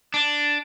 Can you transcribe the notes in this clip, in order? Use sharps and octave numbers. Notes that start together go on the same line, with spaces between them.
D4